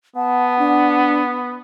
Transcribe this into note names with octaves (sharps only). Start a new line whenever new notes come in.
B3 F#5 A5
D4